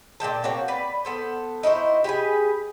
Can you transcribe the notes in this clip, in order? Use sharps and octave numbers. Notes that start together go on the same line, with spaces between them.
A#2 G#3 G5 A5
A#3 C4 F#4 C#5
B4 D5
B3 A4 C5
D#4 E4 F#4 C5
G4 G#4 B4 G#5